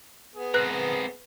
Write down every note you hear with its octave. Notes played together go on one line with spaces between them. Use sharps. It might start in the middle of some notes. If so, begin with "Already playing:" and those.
B3 G#4
C4 A#4 B4 F#6